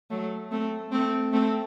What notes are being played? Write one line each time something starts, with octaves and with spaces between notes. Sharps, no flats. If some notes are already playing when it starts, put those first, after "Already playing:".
F#3 A3
A3 C4
A3 C4
A3 C4